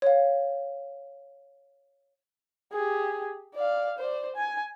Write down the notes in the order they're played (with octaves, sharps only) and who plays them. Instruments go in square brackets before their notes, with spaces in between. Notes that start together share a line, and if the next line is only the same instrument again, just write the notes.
[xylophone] C#5 F5
[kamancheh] G4 G#4
D5 F5
C5 D5
G#5